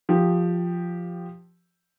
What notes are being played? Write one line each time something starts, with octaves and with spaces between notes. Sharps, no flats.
F3 G4